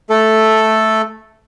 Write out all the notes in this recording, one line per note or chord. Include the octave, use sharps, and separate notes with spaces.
A3 A4